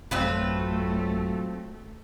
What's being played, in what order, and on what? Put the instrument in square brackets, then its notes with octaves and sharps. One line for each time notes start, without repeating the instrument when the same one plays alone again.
[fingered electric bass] A1 F#2 [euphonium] F#3 [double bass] A3 [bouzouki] C4 F4 B4